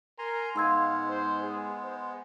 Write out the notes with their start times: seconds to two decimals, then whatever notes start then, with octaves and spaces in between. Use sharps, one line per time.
0.19 A#4 G#5 A#5 C6
0.56 G#2 G#3 B3 F5 C6 E6 G#6
1.09 C5
1.43 G#4
1.84 C5